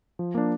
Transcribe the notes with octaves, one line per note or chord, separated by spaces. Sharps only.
F3
A#3 D4